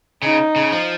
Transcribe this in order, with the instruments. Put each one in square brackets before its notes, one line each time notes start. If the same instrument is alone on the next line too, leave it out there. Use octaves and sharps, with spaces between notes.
[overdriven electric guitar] C#3 [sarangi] D#4
[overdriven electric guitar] C#3
F3